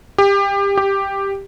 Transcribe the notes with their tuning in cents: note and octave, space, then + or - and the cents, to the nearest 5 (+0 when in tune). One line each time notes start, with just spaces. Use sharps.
G4 +25
G4 +5